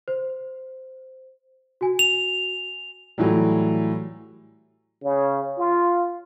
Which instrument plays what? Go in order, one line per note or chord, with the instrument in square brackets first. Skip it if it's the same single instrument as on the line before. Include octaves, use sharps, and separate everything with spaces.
[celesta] C5
F#4 G#5
[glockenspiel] F7
[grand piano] A2 E3 F#3 G3
[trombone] C#3
F4